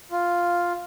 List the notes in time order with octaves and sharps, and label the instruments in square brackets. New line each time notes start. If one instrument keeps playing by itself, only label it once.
[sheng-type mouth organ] F4